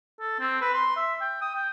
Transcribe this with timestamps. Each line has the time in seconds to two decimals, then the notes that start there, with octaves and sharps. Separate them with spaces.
0.21 A4
0.40 C4
0.61 B4
0.73 C6
0.96 E5
1.21 G5
1.41 D#6
1.55 G5